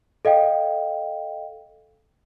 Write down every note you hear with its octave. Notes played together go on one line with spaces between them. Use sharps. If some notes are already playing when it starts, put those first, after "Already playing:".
A4 D#5 F5 G5